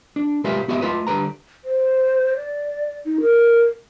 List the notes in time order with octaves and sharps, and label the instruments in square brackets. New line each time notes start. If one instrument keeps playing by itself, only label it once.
[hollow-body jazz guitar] D4
C2 G#3 F4 G4 B4 E5
B3 F#4 G4 D#5 E5
A3 F4 B4 D#5
D3 G3 B4 A#5
[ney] C5
D5
D#4
A#4